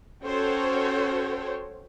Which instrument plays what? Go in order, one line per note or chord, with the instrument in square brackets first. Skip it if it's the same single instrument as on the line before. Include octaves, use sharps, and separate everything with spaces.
[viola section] C#4 F#4 A4 C5 C#5 G5